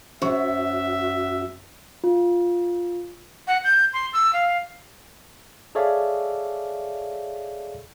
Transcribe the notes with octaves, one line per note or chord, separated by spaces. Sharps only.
F#2 F#4 C5 E5 C#6
F4
F#5
G6
C6
E6
F5
G#4 A4 C#5 D5 E5 F5